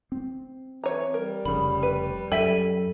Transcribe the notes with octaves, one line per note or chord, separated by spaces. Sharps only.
C4
E3 C#5 A#5
G3 A#4
F1 C#3 B5
B4
F#2 A4 E5 G5 G#5 B6 D#7